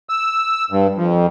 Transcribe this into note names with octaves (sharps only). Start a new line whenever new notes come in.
E6
G2
F2